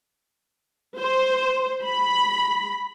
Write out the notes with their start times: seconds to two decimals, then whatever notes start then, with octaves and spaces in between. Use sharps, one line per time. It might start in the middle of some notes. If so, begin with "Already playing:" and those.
0.99 C5
1.83 B5